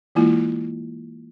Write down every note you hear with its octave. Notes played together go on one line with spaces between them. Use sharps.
E3 G#3 A#3 E4 F4